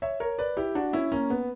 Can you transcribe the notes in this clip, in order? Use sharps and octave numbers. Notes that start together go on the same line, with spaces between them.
C#5 E5
A#4 C#5
B4 D5
E4 G4
D4 F#4
C#4 E4
A#3 C#4
B3